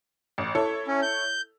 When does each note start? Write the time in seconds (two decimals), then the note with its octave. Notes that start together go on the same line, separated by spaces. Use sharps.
0.38 A1
0.55 E4 A4 C#5
0.87 C#4
1.02 G6